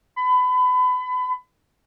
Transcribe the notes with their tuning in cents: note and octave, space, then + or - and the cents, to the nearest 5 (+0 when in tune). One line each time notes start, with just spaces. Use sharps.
B5 +30